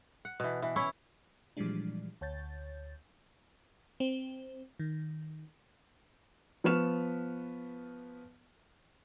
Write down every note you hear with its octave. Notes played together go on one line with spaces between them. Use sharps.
F#5
B2 E3
E3
C#4 E4 C#5
A#2 E3 F3 G3 G#3 D4
D2 C#5 G6 A6
C4
D#3
F3 B3 B4 C#6 F6 E7